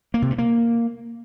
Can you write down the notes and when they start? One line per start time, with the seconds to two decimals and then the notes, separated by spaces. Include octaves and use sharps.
0.14 A#3
0.22 C3
0.30 G2
0.38 A#3